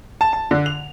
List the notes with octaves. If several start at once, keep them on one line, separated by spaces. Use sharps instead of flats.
A5
A5
D3
F7